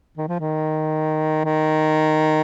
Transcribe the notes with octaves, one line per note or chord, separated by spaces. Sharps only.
D#3
F3
D#3
D#3